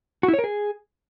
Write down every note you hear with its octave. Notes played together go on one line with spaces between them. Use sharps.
F#4
E4
C#5
A#4
G#4